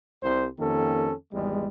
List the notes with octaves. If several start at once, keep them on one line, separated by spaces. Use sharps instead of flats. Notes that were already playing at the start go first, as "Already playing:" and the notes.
C2 C5
F2 D#3 A#3 C#4 G4 A4
G#1 E2 G3 G#3